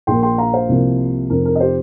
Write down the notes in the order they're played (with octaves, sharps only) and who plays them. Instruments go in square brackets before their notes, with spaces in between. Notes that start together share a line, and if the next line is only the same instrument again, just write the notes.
[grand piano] A#1 A#2 A#3 G5 C6
G5 C6
F5 A#5
C5 F5
C2 C3 F3 A#3
F1 F2 F3 A#4
A#4
D#5
G4 C5